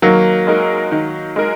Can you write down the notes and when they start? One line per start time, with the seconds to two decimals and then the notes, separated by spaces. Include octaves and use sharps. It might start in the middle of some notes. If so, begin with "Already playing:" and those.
0.02 D#3 F#3 A#3
0.47 G#3 D#4 A#4
0.92 D#3
1.36 G#3 D#4 A#4